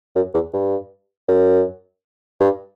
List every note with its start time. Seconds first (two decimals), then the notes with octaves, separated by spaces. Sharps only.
0.15 F#2
0.34 E2
0.53 G2
1.28 F#2
2.40 G2